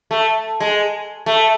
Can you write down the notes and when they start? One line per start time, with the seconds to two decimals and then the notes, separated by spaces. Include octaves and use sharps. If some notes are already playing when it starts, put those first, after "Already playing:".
0.11 A3
0.60 G#3
1.26 A3